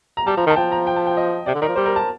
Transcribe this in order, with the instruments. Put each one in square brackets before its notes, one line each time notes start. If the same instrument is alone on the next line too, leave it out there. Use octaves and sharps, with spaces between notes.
[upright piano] A#5
[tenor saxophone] G3 [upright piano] A5
[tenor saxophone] F3 [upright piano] A#5
[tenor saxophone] D#3
[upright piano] A5
[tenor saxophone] F3 [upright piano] G5
[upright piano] A#5
G5
A5
G5
D#5
[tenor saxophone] C3 [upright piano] D5
[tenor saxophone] D3
[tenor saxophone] D#3 [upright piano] A#4
[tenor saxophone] F3
[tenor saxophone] G3 [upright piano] C5
[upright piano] A#4
A5